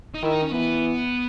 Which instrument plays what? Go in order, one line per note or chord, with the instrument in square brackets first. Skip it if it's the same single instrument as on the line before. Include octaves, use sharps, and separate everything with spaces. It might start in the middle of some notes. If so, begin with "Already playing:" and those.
[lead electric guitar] D#4
[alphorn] D#3 [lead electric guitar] E4
[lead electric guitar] D#4
C#4
[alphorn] E3 [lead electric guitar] B3